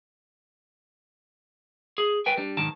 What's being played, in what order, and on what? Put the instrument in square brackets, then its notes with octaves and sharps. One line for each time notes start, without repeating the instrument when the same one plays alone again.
[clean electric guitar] G#4
B4 G5 G#5
G3 D4
B1 G#2 D#3 A5